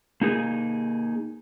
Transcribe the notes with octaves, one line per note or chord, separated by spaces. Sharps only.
A#3 D#4 G#4